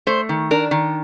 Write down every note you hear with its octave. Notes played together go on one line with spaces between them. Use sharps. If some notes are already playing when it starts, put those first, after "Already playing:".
A3 C5
D#3
D4 A#4
D#3